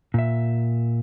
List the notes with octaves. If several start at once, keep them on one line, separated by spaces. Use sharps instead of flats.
A#2 E5